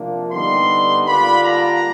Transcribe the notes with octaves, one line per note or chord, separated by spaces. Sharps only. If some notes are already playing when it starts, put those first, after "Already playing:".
Already playing: C3 F3 A#3 D4
D3 G3 B3 D#4 C6
D3 G3 A#3 D4 F4 B5
A#5